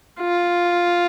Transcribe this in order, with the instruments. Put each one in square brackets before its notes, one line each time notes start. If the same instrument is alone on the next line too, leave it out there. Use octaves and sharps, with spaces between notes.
[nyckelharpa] F4